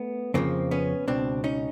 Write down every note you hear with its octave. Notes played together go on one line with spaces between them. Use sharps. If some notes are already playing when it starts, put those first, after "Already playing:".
Already playing: A3 B3
F2 C#3 F3 A#3 C4
B3 C#4
C#2 B2 C4 D4
C#4 D#4